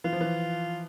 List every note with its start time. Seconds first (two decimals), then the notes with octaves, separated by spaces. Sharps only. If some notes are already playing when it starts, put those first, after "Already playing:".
0.04 E3 F4
0.13 F3
0.21 E3